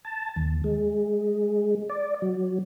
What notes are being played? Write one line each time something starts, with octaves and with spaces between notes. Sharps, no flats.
A5
D#2
G#3
D5
F#3